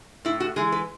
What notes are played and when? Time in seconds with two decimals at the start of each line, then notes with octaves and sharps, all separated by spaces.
0.25 A2 E4
0.40 F#4
0.56 E3 G#3 G#4
0.72 B4